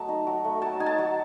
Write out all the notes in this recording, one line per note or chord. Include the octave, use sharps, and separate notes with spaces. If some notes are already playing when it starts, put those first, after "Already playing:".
Already playing: F#3 A3 D#5 A5
D#4
F#3
A3
F#3 A5
D#4 G#5
A5
F#3